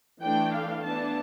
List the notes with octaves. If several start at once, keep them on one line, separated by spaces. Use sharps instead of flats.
E3 A3 D4 G5
F5
E3 B3 D4 A5